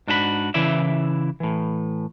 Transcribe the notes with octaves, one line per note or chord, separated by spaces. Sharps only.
G#2 D4 F#4 G#4 B5
C#3 E3 E4 D5 E5
A2 E3